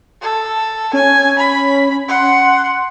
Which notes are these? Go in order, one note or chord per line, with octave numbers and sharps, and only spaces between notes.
A4
C#4 G#5
B5
F#5 C6